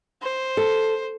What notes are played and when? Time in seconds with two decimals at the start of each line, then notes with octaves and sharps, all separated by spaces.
0.22 C5
0.57 A4